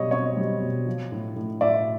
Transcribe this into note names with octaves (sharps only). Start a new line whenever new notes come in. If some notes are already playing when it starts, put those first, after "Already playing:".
Already playing: B2 G3 C#5 D#5
C4 C#5 D#5
G3
B2
F3
A2
A2
A2 D5 E5